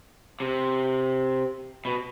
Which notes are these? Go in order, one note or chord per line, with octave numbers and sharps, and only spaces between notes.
C3
B2